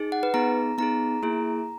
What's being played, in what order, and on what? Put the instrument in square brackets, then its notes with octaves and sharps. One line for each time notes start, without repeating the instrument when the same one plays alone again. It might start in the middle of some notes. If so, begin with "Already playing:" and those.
Already playing: [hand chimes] D#4 G#4
F#5
B4
B3 D#4 G#4 A#5
B3 D#4 G#4 A#5
A#3 E4 G#4